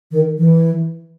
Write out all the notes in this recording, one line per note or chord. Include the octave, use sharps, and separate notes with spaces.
D#3
E3